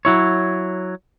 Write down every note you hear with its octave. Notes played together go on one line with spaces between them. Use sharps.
F#3 E4 C#5